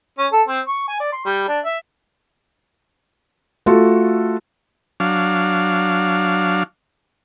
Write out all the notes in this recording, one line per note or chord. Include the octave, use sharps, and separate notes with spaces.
C#4
A4
C4
C#6
G#5
D5
C6
G3
D4
E5
A3 F4 F#4 A4
F#3 D4 F5